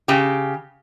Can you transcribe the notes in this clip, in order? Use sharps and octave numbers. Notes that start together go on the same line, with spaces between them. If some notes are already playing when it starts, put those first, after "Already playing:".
C#3 G4